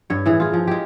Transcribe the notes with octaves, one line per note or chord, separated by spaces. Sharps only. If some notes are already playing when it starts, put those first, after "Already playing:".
G2 C#5
A2 E3 G#4
F4 G#4
F3
G#3 G4